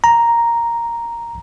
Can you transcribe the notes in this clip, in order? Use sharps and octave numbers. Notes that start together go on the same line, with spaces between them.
A#5